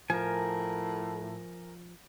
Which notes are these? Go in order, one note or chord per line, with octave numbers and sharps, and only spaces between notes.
A2 F3 A#4 G#5